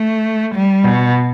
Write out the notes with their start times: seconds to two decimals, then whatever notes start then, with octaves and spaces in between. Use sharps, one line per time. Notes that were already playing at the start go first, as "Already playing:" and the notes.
Already playing: A3
0.55 G3
0.84 B2